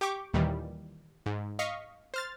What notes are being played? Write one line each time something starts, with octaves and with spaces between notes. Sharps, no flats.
G4 G5 C#6 D6
D#2 A#2 D#3 E3 G3
G#2
D#5 F5 C#6 B6
C5 F6 A6